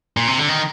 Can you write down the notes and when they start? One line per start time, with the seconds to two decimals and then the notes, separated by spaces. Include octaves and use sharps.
0.17 A#2
0.28 C3
0.38 D3
0.49 D#3